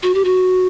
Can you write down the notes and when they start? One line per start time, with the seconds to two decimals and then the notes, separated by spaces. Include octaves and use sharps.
0.03 F#4
0.14 G4
0.25 F#4